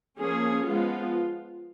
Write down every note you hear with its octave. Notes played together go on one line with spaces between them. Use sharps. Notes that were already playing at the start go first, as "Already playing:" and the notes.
F3 A#3 C#4 G#4
F3 G#3 B3 F4